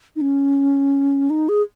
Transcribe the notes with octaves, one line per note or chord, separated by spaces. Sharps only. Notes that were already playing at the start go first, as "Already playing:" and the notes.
D#4
C#4
D#4
G#4